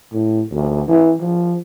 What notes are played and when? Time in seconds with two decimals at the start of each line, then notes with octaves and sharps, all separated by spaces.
0.13 A2
0.52 D2
0.88 E3
1.20 F3